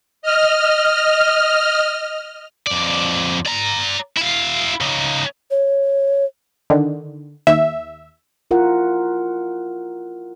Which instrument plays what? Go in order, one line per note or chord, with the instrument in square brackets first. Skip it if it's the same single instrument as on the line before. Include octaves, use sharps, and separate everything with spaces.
[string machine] D#5 F6
[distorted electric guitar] F2 D5
D5 A#5
E4 F5
C#3 D#4
[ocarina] C#5
[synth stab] D3 D#3
D#2 E5
[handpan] E4 F4 A#4 F#5